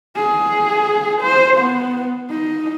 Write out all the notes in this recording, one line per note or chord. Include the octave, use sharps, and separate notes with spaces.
G#4
C5
B3
D#4